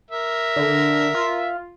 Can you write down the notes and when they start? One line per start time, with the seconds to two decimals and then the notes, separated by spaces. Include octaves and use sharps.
0.11 A#4 E5
0.56 D3
1.15 F4